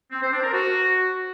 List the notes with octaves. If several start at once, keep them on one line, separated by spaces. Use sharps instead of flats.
C4
C5
D4
A#4
F#4